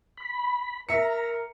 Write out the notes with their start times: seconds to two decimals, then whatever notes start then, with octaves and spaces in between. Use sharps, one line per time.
0.17 B5
0.89 A#4 E5 A#5 C#7